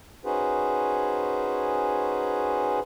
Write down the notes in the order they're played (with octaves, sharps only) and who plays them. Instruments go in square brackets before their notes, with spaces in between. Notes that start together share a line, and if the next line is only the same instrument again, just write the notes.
[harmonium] C#4 D#4 F#4 G#4 B4 C5